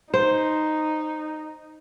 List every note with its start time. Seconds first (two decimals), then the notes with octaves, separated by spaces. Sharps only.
0.14 D#4 C5